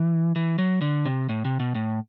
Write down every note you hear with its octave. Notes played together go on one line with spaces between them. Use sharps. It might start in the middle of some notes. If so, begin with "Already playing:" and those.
Already playing: E3
E3
F#3
D3
C3
A2
C3
B2
A2